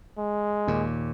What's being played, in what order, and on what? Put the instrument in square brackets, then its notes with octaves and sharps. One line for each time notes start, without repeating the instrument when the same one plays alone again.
[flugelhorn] G#3
[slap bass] D#2 A#2